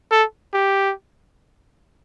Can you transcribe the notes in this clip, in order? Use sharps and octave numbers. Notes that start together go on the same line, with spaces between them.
A4
G4